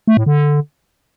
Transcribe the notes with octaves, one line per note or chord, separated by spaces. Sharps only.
A3
A2
D3